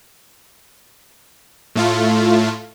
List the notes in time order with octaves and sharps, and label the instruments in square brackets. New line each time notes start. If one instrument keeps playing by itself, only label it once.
[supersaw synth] A2 A3 F4